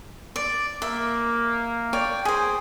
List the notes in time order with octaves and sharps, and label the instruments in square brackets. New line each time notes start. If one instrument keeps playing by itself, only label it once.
[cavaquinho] D5
[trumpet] A#3 [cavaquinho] E5
[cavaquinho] C#5 D5 G5
[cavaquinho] G#4 C5 [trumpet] G#5